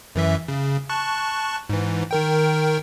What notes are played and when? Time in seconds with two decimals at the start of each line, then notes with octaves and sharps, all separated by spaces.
0.15 F#2 E3 E5
0.48 C#3
0.89 A5 C#6 F#6
1.70 G#2 E3
2.11 D#3 A#4 G5